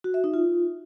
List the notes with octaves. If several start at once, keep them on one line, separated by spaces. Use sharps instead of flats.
F#4
E5
D#4
F4